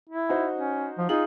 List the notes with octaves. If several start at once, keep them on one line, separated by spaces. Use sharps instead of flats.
E4
D#4 F#4 C5
C#4
F3
D#4 F4 G#4 F#7